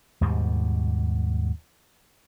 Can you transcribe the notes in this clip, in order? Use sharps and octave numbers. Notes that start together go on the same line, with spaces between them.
D#2 G#2 B2 G3